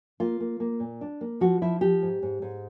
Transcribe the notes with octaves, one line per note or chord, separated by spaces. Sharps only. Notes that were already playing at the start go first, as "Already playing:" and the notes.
A#3 F4
A#3
A#3
A#2
D4
A#3
F3 F#4
F3 E4
F3 G4
G#2
G#2
G#2